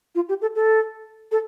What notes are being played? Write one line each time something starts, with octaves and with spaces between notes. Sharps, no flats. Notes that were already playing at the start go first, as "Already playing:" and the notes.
F4
G4
A4
A4
A4